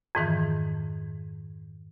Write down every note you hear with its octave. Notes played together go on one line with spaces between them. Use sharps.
F2 G#2 D#3 E3